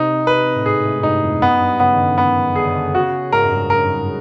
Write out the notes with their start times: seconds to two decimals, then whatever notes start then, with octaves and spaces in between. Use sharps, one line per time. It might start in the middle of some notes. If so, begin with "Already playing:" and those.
Already playing: C3 D#4
0.27 B4
0.56 A2
0.66 G#2 G#4
0.85 A2
1.00 G#2
1.03 G2 D#4
1.23 F2
1.42 F#2 B3
1.53 F#2
1.61 G2
1.80 C#3 B3
1.94 D#3
1.99 D3
2.18 D#3 B3
2.56 D3 G#4
2.66 C#3
2.76 D3
2.94 C#3 F#4
3.32 G#2 A#4
3.45 F#2
3.51 G2
3.70 F#2 A#4
3.89 F#2